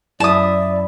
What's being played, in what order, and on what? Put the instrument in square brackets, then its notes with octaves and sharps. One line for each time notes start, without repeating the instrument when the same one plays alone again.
[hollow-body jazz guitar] F#2 [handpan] E4 E5 [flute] D5 [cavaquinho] A5 D#6